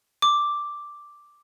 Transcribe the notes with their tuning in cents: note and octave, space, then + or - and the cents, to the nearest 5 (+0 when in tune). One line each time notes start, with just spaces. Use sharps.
D6 +0